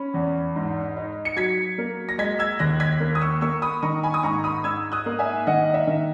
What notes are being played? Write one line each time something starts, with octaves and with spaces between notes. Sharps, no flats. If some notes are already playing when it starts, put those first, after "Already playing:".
Already playing: C#4 B5
E2
G#2
D#4
C#7
F#3 G#6 B6
A#3
A#6
G#3 G#6 B6
E6 G#6
D#2 F#6 A#6
G#6 B6
A#3
D#6
C#6 E6
A#3 C#6 E6
B5 D#6
D#3 A#5 C#6
G#5 B5
D#6
G#2 A#5 C#6
B5 D#6
G#2 E6 G#6
D#6 F#6
A#3
E5 G#5
D#3 D#5 F#5
E5
D#3